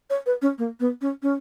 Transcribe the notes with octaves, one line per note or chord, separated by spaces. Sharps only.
C#5
B4
C#4
A#3
B3
C#4
C#4